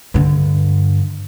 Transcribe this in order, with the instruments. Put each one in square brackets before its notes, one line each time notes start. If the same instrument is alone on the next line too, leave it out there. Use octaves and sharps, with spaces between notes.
[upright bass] G2 D3